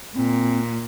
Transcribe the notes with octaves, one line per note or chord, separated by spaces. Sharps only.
A#2 C4